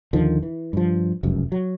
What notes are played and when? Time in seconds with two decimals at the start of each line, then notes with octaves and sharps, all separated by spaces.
0.13 D#2 D3 D#3 F3
0.43 E3
0.73 G2 F3
1.23 F1 C#2 F#2
1.52 F#3